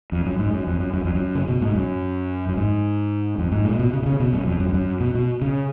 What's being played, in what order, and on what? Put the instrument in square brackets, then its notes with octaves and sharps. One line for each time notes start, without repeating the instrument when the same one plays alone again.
[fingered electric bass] F2
F#2
G#2
F#2
F2
F#2
F#2
F2
F#2
C#3
B2
G#2
F#2
F#2
G#2
F2
G#2
A#2
B2
C#3
B2
C#3
B2
F#2
F2
F#2
F2
F#2
B2
B2
C#3